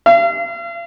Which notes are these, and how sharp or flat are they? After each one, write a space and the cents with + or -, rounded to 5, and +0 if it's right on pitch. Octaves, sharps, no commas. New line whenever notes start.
F5 -45